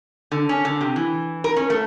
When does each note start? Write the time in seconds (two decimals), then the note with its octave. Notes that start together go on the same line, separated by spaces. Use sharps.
0.32 D3
0.49 C#4
0.65 D3
0.81 C3
0.96 E3
1.44 A#4
1.56 C#4
1.70 A3